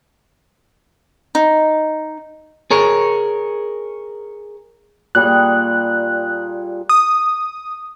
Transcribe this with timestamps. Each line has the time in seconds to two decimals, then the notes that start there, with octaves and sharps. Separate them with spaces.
1.35 D#4
2.71 G#4 A#4 C#5
5.15 A#2 G3 G#4 F#6
6.89 D#6